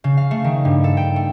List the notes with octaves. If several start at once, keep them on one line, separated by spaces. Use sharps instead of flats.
C#3
F5
A3
D#3
G2
A4
G5
A3